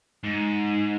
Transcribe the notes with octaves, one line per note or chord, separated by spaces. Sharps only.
G#2